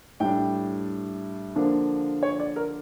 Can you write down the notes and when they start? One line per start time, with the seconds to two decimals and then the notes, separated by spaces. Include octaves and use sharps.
0.20 A2 G3 D4 G5
1.56 D3 F3 A#3 D4
2.23 C#5
2.40 D5
2.56 A#4